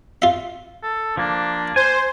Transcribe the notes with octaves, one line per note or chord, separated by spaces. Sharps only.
F4 E5
A4
F3 A#3 D4
C5 G#5